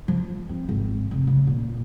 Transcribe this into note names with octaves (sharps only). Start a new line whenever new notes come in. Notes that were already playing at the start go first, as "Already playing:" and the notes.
F3
C4
G#1
F1
C#3
A#2